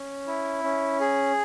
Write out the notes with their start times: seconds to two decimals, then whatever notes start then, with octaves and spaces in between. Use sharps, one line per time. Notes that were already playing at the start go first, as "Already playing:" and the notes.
Already playing: C#4
0.27 E4
0.64 C#4
1.00 G#4